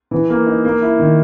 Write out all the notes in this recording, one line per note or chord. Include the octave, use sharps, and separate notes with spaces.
E3
A#3
D#4
A#3
E4
D#3